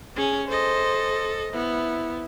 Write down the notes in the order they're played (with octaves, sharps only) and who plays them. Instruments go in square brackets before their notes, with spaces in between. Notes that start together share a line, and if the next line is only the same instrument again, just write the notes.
[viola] C#4 [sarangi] G#4
[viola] A4 D#5 [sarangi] C5
[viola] B3 [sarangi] E4